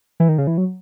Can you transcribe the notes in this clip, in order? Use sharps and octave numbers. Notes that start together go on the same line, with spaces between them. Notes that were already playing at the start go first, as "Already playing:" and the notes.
E3
D#3
C#3
E3
F#3